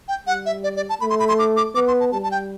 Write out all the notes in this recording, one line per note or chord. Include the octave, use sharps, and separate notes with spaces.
G5
G3 F#5
E5
D5
D5
A5
A3 B5
C6
B5
C6
D6
D6
B3 D6
C6
A5
G3 A5
A5
G5